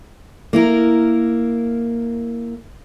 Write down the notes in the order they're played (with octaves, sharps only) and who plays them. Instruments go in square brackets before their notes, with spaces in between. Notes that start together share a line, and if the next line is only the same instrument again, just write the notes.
[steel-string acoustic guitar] A#3 E4 A#4